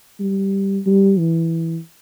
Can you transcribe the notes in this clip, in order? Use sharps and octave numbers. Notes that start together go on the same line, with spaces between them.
G3
G3
E3